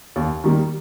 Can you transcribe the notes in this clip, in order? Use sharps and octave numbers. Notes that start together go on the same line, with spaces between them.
D#2
D#3 G3 A#3